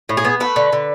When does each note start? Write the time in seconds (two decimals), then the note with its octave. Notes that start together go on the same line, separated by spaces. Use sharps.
0.09 A2
0.17 G#4
0.24 B3
0.40 A3 B4
0.56 D3
0.73 D3